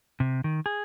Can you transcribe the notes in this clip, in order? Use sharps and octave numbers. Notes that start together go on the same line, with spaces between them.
C3
D#3
G#4